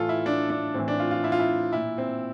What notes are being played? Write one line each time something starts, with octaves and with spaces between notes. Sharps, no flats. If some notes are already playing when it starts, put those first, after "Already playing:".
Already playing: A2 E3 F4 A4
E4
D4
D4
A2 E3 C4
D4
F4
F4
E4
F4
E4
A#2 E4
C4